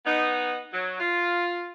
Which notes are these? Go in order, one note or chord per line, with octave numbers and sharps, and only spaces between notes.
B3 D#4
F#3
F4